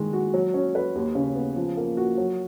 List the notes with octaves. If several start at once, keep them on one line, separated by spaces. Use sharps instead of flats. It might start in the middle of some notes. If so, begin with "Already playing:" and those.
Already playing: D#3 G#3
F#4
F#3
C#4
B4
D#2
C#3
B3
F3
A#3
F#4
F#3